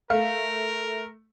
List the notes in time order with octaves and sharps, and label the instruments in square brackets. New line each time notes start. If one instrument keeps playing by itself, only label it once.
[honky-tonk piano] A3 [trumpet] A#4 [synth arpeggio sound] F5